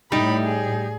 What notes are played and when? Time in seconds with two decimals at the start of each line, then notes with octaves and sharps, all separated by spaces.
0.12 A2 G3 D#4 B5
0.45 G#4